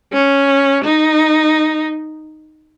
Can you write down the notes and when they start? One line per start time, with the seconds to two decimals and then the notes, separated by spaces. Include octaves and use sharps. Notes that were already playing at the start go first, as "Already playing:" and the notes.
0.13 C#4
0.84 D#4